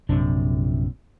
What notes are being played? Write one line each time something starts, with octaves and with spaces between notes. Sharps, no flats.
A#1 F#2 C3 D4